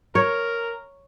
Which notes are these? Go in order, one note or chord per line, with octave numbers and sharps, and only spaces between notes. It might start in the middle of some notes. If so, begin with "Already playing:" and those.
A#4 C#5